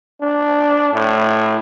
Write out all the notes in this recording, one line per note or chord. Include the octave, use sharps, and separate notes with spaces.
D4
A2